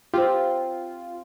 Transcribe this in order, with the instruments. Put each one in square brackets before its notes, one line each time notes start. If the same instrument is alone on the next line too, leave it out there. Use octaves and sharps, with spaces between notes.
[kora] C4 G4 [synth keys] F4